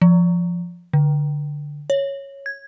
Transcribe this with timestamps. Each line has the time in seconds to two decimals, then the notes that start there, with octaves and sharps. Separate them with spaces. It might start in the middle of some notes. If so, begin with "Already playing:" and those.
0.02 F3
0.93 D3
1.90 C#5
2.46 G#6